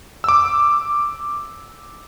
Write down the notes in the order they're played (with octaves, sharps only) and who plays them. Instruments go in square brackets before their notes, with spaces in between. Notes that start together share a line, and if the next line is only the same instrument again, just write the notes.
[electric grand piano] D6 E6